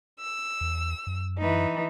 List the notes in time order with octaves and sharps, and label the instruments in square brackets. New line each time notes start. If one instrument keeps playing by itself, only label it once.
[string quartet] E6
[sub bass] E2
F#2
[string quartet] E3 D#4